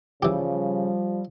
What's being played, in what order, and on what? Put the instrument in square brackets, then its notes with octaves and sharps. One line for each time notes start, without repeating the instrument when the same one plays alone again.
[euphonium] C#3 [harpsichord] E3 G4 [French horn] F3 [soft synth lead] G3